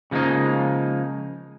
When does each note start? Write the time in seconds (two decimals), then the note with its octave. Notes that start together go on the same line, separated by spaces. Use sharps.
0.11 C#3 F3 G#3 A#3 D#4